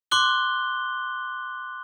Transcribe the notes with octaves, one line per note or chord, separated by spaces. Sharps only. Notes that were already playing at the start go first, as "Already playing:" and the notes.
C6 D6 F#6 G7